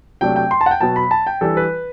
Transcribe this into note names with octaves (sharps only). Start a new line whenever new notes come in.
C3 F#3 A3 D4 G5
G5
C6
A5
F#5
G5
B2 F#3 B3 A5
B5
A5
G5
E3 G3 D4 A4
B4